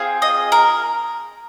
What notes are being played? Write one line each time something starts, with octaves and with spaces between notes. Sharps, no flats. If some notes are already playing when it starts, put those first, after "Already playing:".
Already playing: C4 F4 G#4
D#5
A#4